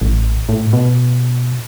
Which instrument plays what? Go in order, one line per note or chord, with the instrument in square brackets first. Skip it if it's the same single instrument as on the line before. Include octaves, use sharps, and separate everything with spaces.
[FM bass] A1
A2
B2